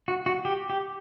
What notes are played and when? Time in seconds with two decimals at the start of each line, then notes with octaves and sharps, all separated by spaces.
0.08 F#4
0.26 F#4
0.45 G4
0.70 G4